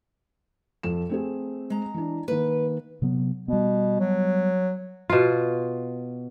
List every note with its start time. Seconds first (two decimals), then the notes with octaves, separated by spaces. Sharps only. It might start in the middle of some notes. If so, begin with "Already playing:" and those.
0.83 F2 A4 E7
1.09 A3 C4 G#4
1.70 G#3 A#5
1.94 E3 D4
2.28 D#3 A#3 B4
3.02 C3 F#3 B3
3.48 B2 G3 B3
4.00 F#3
5.10 B2 F4